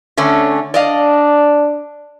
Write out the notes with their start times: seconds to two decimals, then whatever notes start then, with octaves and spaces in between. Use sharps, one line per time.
0.17 D3 A3 C#4
0.74 D4 D5 D#5 F5